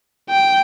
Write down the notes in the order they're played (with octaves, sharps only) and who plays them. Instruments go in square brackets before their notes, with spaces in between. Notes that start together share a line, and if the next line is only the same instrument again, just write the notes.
[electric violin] G5